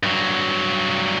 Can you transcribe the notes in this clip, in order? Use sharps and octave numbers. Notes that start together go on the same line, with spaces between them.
G2 F#3